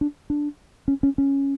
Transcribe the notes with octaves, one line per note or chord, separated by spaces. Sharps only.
D4
D4
C#4
C#4
C#4